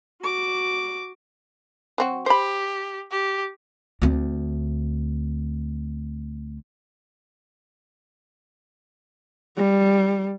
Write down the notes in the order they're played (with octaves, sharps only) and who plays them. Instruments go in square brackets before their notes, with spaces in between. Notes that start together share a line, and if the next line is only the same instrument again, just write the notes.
[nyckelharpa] F#4 D6
[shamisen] F#3 C4 F#4
[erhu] G4 [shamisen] C5 B5
[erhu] G4
[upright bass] D2 C4
[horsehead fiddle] G3